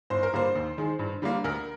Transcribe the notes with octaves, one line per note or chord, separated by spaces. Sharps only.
G1 C5
A#4
G2 D3 G3 A#3 C5
D#2
D#3 G#3
G2
D3 G3 A#3
D2 A#4